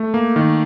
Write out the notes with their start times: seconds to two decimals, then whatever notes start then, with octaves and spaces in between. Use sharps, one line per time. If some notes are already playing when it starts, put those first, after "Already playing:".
Already playing: A3
0.14 A#3
0.36 D#3